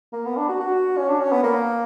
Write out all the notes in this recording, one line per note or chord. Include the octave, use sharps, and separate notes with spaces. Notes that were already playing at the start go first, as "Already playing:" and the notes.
A#3
B3
D4
F#4
F#4
C#4
D4
C#4
B3
A#3